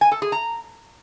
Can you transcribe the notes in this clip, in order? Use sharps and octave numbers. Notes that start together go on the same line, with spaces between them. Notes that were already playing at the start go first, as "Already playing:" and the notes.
G#5
A4
G#4
A#5